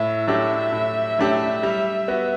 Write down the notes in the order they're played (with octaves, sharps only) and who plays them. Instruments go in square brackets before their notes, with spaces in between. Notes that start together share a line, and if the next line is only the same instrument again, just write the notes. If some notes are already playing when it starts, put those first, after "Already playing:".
Already playing: [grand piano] A2 [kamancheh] E5
[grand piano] F#3 A3 D4 G4
A2
F#3 A3 D4 G4
G3
B3 F#4